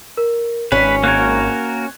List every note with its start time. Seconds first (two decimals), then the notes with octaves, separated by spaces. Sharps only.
0.17 A#4
0.72 G#1 C#4 B4 B6
1.04 A#3 F#4 A#4 F#6 G#6